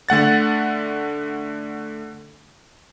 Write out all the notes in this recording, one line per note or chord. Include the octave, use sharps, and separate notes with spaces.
D3 A3 F#5 A6